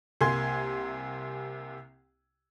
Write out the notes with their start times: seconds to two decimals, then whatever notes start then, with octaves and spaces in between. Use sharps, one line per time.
0.21 C2 C3 A#3 G#5 C6 G#6